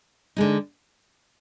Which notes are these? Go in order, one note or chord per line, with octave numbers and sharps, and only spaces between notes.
D3 G#3 D#4